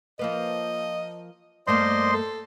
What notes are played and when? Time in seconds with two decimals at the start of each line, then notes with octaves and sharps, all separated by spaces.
0.19 F3 A#3 B4 D#5
1.67 G2 A3 A#3 C5 D5 D#5 C6
2.13 A4